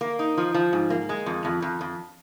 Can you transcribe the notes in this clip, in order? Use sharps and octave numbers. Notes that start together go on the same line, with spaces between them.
A#3
D#4
F3
F3
G#2
A#3
G#3
F2
F2
F2
F2